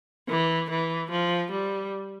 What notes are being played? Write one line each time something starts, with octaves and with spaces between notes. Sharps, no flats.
E3
E3
F3
G3